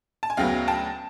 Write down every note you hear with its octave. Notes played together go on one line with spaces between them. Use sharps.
A5
G#5
D2 C#3 F#3 B3 F5 G5
G5 A5